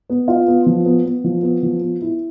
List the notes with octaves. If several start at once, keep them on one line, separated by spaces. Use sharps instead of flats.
B3
F4
B3
F3
B3
B3
F3
B3
F3
B3
E4